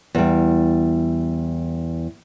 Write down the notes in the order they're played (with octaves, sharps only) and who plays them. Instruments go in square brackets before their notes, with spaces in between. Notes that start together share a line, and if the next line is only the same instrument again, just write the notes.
[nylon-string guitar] E2 G3